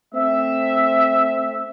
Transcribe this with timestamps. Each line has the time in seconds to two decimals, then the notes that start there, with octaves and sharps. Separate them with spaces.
0.15 A3 C4 E5